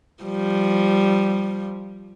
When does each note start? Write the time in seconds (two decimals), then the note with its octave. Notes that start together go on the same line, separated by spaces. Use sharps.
0.23 F3 G3